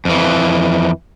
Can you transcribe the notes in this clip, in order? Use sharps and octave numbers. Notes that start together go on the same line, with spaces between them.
F2 E3